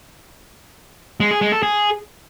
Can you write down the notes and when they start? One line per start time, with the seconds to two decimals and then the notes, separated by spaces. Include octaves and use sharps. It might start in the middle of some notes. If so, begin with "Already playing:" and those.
1.20 G#3
1.31 G#4
1.42 G#3
1.52 A4
1.63 G#4